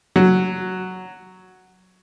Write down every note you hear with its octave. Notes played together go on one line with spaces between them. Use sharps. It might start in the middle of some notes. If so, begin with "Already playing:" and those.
F#3